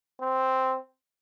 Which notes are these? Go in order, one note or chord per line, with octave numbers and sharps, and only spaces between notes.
C4